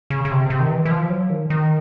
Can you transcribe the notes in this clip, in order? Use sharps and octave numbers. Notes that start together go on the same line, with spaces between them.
C#3
C#3
C3
C3
D#3
E3
E3
F3
F#3
D#3
D#3